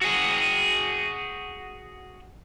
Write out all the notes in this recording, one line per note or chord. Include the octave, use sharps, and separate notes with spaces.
F#4 G#4